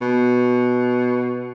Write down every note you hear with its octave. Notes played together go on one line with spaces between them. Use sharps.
B2